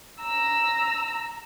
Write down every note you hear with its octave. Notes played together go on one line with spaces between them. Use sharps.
A#5 E6